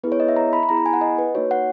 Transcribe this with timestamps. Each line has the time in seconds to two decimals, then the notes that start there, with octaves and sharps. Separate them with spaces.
0.03 B3 E4 G#4 B4
0.12 C#5
0.20 D#5
0.28 E5
0.36 A#5
0.53 B5
0.63 B5
0.69 B3 E4 G#4 A#5
0.77 B5
0.86 G#5
0.93 F#5
1.01 D#5
1.18 B4
1.35 A#3 D#4 F#4 C#5
1.51 F#5